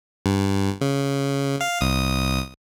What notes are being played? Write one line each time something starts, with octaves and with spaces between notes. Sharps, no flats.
G2
C#3
F5
C2 D#6